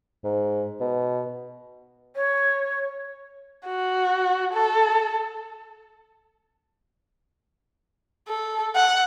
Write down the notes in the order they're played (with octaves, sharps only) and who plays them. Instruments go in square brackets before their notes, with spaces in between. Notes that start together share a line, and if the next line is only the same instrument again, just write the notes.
[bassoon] G#2
B2
[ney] C#5
[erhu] F#4
A4
A4
F#5